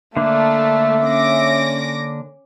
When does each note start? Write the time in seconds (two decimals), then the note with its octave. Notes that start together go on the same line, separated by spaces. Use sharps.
0.17 D3 A3 A#3 D4 E5
1.06 C#4 D6 A#6